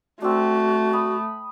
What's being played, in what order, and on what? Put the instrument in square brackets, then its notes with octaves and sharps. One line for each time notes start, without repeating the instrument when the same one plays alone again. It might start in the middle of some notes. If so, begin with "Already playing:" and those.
[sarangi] A3 [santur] C4 D4 [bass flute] F#4
[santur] B5 D#6